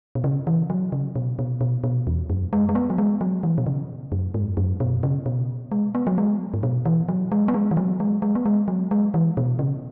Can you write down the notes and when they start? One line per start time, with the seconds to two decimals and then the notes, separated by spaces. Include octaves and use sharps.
0.15 B2
0.24 C#3
0.47 E3
0.70 F#3
0.92 C#3
1.16 B2
1.39 B2
1.61 B2
1.84 B2
2.07 E2
2.30 F#2
2.53 G#3
2.69 G#3
2.75 B3
2.90 F#3
2.98 G#3
3.21 F#3
3.43 E3
3.58 B2
3.66 C#3
4.12 F#2
4.34 G#2
4.57 F#2
4.80 B2
5.03 C#3
5.26 B2
5.72 G#3
5.95 B3
6.07 F#3
6.18 G#3
6.54 G#2
6.63 B2
6.86 E3
7.09 F#3
7.32 G#3
7.48 B3
7.54 G#3
7.71 E3
7.77 F#3
8.00 G#3
8.22 G#3
8.35 B3
8.46 G#3
8.68 F#3
8.91 G#3
9.14 E3
9.37 B2
9.59 C#3